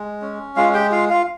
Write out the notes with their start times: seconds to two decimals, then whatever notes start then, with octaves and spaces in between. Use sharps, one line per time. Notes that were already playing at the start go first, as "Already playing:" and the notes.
Already playing: G#3
0.22 C#4
0.56 G#3 F4 F5
0.74 G4 G5
0.92 F4 F5
1.10 F4 F5